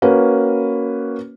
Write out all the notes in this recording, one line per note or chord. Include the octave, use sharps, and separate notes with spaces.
A#3 C#4 F#4 B4